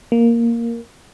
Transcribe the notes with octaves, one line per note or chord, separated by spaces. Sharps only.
A#3